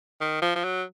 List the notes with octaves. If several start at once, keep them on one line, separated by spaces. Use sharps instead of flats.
D#3
F3
F3
F#3